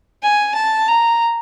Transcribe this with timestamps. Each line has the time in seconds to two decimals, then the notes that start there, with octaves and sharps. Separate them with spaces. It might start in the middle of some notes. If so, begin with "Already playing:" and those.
0.23 G#5
0.55 A5
0.88 A#5